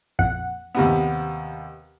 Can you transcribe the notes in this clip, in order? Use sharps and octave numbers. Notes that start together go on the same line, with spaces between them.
A#1 F2 F#5
D#2 C3 B3